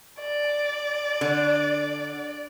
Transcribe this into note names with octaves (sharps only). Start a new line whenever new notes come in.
D5
D3